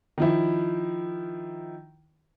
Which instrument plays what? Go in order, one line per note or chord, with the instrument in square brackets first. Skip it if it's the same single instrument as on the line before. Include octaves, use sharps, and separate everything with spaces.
[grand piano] D#3 F3 E4